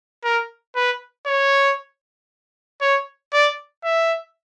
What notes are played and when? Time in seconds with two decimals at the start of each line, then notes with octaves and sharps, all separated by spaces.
0.24 A#4
0.75 B4
1.26 C#5
2.81 C#5
3.33 D5
3.84 E5